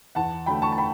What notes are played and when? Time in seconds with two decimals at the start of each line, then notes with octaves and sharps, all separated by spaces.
0.15 E2 F#5 A5
0.46 D3 F#3 A3 G5 B5
0.62 A5 C#6
0.72 A5
0.78 G5 B5